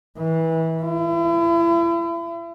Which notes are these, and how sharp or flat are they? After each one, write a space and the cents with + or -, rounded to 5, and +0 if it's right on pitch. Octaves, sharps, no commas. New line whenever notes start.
E3 -25
E4 +35